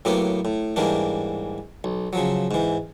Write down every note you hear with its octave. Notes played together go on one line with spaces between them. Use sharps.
A2 F#3 A#3 B3 G4
A2
G#2 E3 G3 A#3 D4
B1
C#3 F3 F#3
G#2 E3